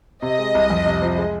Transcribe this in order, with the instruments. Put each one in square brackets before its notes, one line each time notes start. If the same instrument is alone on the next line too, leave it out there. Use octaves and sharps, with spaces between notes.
[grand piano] C3 [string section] D#5
[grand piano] G#3
C2
F2
C3
F3
G#3